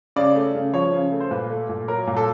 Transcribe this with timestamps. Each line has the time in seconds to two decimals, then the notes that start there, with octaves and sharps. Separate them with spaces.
0.16 C#3 D5
0.35 A3
0.55 C#3
0.74 F3 C#5
0.93 C#3
1.12 A3
1.20 C5
1.31 A#2 B4
1.50 A3
1.69 A#2
1.88 F#3 A#4
2.07 A#2
2.17 A4